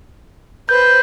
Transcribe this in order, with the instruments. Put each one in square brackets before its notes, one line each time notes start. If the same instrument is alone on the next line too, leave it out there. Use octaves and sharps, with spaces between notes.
[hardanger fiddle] B4 C5 [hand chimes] G6